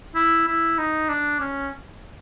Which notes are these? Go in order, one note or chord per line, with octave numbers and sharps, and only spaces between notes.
E4
E4
D#4
D4
C#4